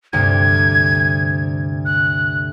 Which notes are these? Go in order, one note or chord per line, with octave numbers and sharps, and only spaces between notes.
D2 G2 C3 G#6
F#6